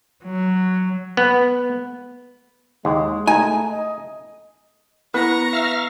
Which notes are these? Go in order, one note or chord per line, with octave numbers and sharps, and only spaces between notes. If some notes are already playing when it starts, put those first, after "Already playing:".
F#3
B3
D#2 G#3
A3 D#4 G#5
D#5
B3 E4 B4 A#5 C#6 A#6
E5 F5 F6